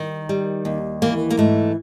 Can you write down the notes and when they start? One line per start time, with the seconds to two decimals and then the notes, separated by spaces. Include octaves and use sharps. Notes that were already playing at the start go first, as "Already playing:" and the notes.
Already playing: D#3 G3
0.29 G3
0.65 D#2
1.02 E3 A#3
1.31 A#3
1.37 G#2 A3